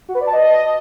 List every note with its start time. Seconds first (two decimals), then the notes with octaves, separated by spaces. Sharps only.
0.09 F#4
0.15 B4
0.21 D5
0.27 A5
0.33 D#5